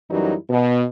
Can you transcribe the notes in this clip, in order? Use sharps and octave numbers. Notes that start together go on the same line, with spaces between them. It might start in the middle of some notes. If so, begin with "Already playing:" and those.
F#2 E3 F#3 G3 D#4 E4
B2